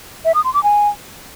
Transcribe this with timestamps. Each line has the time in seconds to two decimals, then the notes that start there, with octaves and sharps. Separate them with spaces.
0.25 E5
0.35 D#6
0.44 C6
0.54 D6
0.64 G#5